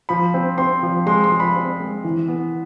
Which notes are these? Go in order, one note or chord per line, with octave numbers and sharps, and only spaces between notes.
F3 B5
C4
C4 C6
F3
G#3 C6
C6
F3
B5
C4
G#3
E3
B3